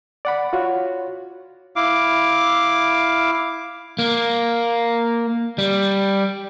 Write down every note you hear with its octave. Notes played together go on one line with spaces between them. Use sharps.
D5 F#5 B5
F4 F#4 C#5
E4 F5 D6
A#3
G3